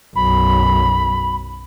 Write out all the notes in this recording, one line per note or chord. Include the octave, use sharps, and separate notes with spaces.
B1 F#2 B5